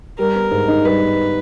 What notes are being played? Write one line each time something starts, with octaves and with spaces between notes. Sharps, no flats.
G3 A#4
B3
G#2
D#4
G3 B4
B3